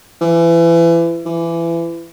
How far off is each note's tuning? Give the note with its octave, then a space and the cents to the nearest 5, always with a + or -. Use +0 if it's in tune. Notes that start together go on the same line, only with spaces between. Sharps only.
E3 +30
E3 +25